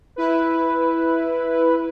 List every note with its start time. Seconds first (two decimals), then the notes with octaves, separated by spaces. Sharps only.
0.16 E4 B4